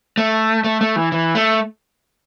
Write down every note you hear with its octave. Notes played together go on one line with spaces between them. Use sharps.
A3
A3
A3
E3
E3
A3